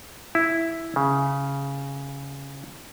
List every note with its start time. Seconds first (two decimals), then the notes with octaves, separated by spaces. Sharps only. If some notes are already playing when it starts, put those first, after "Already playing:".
0.35 E4
0.96 C#3